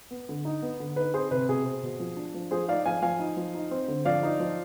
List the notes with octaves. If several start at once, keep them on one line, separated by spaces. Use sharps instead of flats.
B3
D3
D#4
B3
D3
D#4 B4
C4 G#4 C5
C3 B4
B2 G#4
C4
B2
F3
D4
F3
F3 G#4 C5
D#4 D5 F5
F3 F5 G#5
F3 F5 G#5
D#4
F3
D#4
C4
D3
F3 D5 F5
D#4
F3